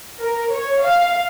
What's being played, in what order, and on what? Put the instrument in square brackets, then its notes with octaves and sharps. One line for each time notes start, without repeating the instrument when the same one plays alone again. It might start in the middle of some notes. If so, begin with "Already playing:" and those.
[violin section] A#4
C#5
F5